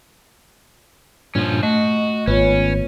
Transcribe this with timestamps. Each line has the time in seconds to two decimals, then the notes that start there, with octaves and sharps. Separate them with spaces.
1.35 G2 A#2 F3 C#4
1.63 A3 F#4 D#5
2.27 G#1 B3 C#4 F4 B4 C#5